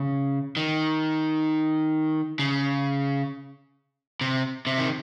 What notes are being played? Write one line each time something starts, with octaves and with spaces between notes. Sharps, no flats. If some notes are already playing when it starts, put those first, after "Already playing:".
Already playing: C#3
D#3
C#3
C3
C3
D#3